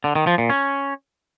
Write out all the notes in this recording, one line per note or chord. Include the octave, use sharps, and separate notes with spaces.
D3
D#3
F3
A#2
C#4